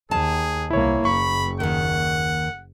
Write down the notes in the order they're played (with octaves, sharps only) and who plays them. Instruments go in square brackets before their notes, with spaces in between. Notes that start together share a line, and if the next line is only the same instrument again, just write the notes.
[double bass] D#2 [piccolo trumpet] G#4 [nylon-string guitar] A5
[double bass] C2 A#3 [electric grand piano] E4 C#5
[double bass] F#1 [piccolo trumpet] B5 [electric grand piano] C#6
[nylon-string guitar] D#2 D#3 [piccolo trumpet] F#5